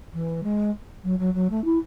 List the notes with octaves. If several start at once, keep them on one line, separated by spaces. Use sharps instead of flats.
E3
G#3
F#3
F#3
F#3
A3
E4